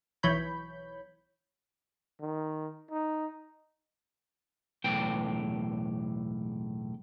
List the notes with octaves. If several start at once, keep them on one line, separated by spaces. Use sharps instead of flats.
B1 E3 C#5 B5 G6
D#3
D#4
B1 E2 A2 G4 G5